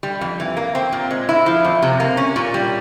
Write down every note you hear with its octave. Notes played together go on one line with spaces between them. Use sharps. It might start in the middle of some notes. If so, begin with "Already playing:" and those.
G3
F2
E3
A#3
C4
A#2
G#3
E4
F3
F2
C3
A#3
C#4
A#2
G3